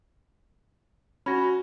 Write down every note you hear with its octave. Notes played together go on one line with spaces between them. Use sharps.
C#4 F#4 B5 G#6 A#6